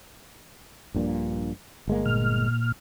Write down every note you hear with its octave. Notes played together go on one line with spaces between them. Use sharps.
A#1 G2 A#2
G1 G#3 A#3
A#2 F6